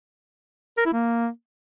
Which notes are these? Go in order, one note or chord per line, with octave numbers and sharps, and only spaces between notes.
A#4
E4
A#3